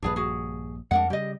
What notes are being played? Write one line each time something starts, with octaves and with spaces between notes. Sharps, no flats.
A#1 G2 D4 G#4 B4
F#4 G#4
F2 G#3 D4 A#4 F#5
C#3 G3 G4 D#5